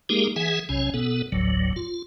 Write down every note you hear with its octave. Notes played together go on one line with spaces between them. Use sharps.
G#3 A#3 D#4 G4 G#4 A#4
E3 G#4 E5 F#5 G#5
B1 C3 C#4 C#5 G#5
B2 B3 A4
G1 D2 A2 F#3
F4